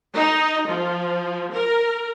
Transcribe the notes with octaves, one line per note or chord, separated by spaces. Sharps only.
D#4
F3
A#4